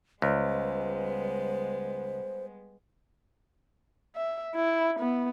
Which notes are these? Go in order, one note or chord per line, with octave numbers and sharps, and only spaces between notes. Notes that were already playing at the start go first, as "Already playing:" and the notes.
C#2 G3 G#3 B3 C5
E5
E4
B3